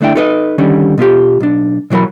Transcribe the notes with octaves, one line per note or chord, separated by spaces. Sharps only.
D2 A3 D4 E4 G5
D#4 A4 B4 D5 D#5
D3 D#3 G3 C#4
B2 B3 F4 G4
B1 D4
B2 E3 F#3 A#4 B5